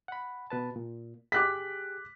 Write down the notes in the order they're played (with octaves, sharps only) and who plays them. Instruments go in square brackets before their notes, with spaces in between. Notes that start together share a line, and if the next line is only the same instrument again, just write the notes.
[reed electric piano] F#5 B5
B2 B4 A5
A#2
[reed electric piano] G4 G#4 [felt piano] D6 F#6 B6